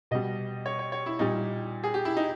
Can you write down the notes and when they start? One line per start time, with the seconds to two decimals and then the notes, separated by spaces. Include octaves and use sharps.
0.11 B2 G3 D#5
0.66 C#5
0.79 C#5
0.92 C#5
1.06 E4
1.19 A#2 G3 D#4
1.84 G#4
1.94 G4
2.05 E4
2.17 D#4